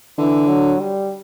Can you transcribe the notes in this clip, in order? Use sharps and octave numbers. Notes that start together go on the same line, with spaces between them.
D3 E3
F#3
G3